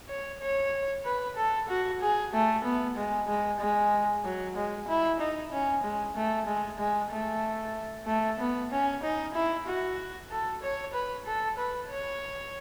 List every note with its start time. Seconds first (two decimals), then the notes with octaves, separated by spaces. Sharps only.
0.08 C#5
0.41 C#5
1.05 B4
1.36 A4
1.68 F#4
2.01 G#4
2.33 A3
2.64 B3
2.96 G#3
3.28 G#3
3.59 G#3
4.24 F#3
4.56 G#3
4.88 E4
5.20 D#4
5.51 C#4
5.83 G#3
6.16 A3
6.47 G#3
6.79 G#3
7.11 A3
8.06 A3
8.39 B3
8.71 C#4
9.03 D#4
9.34 E4
9.67 F#4
10.31 A4
10.62 C#5
10.93 B4
11.25 A4
11.58 B4
11.89 C#5